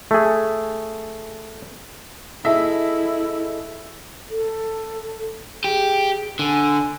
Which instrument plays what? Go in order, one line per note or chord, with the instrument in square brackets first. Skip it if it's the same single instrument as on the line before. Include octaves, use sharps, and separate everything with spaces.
[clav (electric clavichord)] A3 G#4
[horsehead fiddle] E4 [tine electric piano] G#4 A4 D#5 [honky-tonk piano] E5
[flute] A4
[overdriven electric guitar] G4 [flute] G#4
[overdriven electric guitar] D3 [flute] G#5